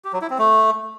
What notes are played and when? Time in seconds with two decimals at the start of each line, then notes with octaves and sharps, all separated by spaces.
0.05 G4
0.13 F#3
0.22 E4
0.30 C4
0.39 A3